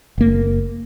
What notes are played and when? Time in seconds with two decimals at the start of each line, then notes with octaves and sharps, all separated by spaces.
0.18 F#1 A#3